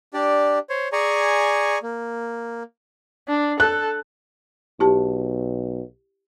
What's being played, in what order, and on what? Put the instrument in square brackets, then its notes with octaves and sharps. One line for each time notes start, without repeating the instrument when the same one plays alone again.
[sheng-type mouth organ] D4 G4 D5
C5 C#5
G#4 D5 G#5 A#5 C#6
A#3
[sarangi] D4
[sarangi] A4 [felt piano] F#6
[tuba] B1 [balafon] E4 G4 A5